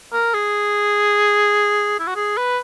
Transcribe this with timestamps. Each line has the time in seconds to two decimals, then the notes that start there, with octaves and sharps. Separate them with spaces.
0.13 A#4
0.34 G#4
2.00 E4
2.07 F#4
2.16 G#4
2.37 B4